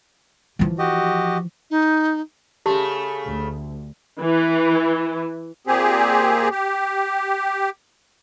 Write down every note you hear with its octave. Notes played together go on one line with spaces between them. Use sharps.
E3 F3
F#4 G4 D#5
D#4
C#3 A3 G4 A5 C6
D2
E3
A#2 C4 G4 G#4
G4